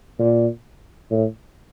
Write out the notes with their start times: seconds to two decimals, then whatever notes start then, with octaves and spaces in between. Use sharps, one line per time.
0.19 A#2
1.11 A2